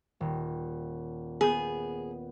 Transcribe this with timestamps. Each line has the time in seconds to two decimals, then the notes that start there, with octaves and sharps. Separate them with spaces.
0.20 D#1
1.41 B3 G#4 G6